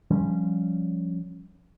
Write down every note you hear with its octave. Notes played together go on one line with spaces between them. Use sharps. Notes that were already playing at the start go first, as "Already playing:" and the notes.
F3 G3 C#4